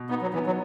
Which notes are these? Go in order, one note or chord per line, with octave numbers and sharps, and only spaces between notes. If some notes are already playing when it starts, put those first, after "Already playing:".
Already playing: B2
B3 D#4
F#3
E3 B3
F#3